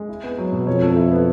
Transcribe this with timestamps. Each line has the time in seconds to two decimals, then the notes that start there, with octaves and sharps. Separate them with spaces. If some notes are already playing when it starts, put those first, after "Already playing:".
Already playing: G#3
0.09 E4
0.23 B3
0.38 F#3
0.52 B2
0.67 F2 C#5
0.82 A4
0.97 E4
1.11 B3